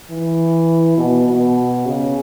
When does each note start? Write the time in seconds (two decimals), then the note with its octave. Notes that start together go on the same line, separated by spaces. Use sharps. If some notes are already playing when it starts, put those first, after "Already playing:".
0.10 E3
0.97 B2
1.27 B2
1.85 C#3